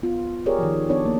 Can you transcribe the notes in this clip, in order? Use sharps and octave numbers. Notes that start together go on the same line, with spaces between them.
B3 F4
G4 G#4 A#4 C#5 D5
D#3 F3
B3 D4 C#5 D5
A#3